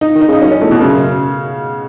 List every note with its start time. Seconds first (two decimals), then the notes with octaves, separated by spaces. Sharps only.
0.01 D#4
0.15 D#3
0.21 D#4
0.28 C#3
0.33 D#4
0.41 F#2 C#4
0.52 C#4
0.61 E2 A3
0.71 B2
0.81 F#2 C#3